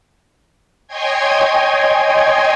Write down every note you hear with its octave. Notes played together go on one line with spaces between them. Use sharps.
C#5 D#5 G5 G#5 C6 G#6